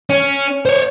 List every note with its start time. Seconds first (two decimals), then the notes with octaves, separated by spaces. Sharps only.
0.09 C#4
0.65 C5 C#5